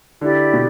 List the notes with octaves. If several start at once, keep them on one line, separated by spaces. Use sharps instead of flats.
D3 E4 G4 D5
B2